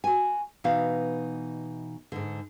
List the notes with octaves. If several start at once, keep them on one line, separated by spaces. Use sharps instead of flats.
F#4 G#5
B2 E3 D#4 F5
G#2 D3